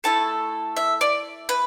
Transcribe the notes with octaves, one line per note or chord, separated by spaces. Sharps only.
A3 E4 A4 A5
E5
D5
B4